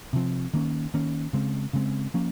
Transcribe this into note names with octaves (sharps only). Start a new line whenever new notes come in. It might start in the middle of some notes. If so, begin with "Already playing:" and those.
C3 F3 C4
D#3 A#3 C#4
D#3 A#3 C#4
C#3 G#3 C4
C#3 G#3 C4
F3 A#3 C#4